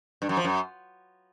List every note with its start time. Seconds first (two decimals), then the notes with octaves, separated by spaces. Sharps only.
0.22 G2
0.29 F#2
0.37 F3
0.44 F#2